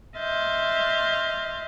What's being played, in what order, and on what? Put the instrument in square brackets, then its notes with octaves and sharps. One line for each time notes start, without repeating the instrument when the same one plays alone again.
[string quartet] D#5 E5 C6 F6 G6 A6